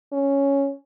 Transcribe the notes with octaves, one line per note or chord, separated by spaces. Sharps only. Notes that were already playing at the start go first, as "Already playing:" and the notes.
C#4